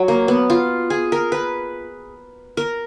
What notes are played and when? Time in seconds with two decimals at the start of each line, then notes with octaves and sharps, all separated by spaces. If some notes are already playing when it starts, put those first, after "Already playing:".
Already playing: F#3
0.08 A#3
0.28 B3
0.50 F4
0.90 G#4
1.12 A#4
1.32 B4
2.57 A#4